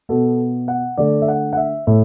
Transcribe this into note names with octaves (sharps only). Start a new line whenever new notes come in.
B2 B3 A4
F#5
D3 A3 D5
E5
F#5
F#5
E5
A2 A3 E5